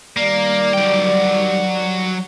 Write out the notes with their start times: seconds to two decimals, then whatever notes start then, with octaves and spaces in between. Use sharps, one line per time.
0.17 D#3 G3 A#3 D5
0.74 F#3 G5